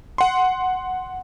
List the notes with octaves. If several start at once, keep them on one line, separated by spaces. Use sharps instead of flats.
F#5 C6